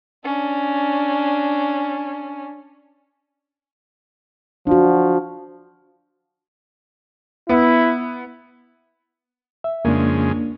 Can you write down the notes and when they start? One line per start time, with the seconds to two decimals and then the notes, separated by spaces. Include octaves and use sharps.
0.25 C#4 D4
4.67 F3 D4 F#4
7.49 B3 E4
9.64 E5
9.85 F2 C#3 G#3 A#3 D4